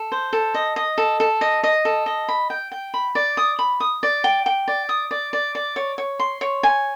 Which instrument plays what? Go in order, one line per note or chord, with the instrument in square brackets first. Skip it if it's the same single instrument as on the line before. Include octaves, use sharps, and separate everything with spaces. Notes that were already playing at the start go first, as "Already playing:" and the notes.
Already playing: [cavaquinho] A4
C5
A4
D#5
D#5
A4
A4
D#5
D#5
A4
D#5
B5
G5
G5
B5
D5
D#6
B5
D#6
D5
G5
G5
D5
D#6
D5
D5
D5
C#5
C#5
C6
C#5
G#5